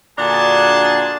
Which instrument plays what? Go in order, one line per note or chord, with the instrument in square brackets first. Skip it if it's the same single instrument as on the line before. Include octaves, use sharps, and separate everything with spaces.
[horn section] A#2 D3 D4 F#4 G#4 A5